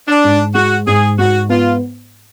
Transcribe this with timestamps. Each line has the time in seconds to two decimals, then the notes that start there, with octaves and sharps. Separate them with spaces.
0.08 D4
0.24 G#2
0.55 G#3 F#4
0.87 G#2 G#4
1.18 G#2 F#4
1.49 B3 F4